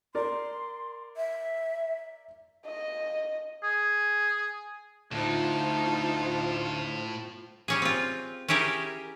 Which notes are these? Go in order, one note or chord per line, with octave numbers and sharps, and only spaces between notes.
A#4 D5 C6
E5
D#5
G#4
D2 A2 D#4 F4 C5 A5
G3 C#4 G#4
C4 F4
C#4 E4 G4 G#4 A#4